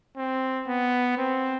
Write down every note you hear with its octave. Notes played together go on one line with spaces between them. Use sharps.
C4
B3
C4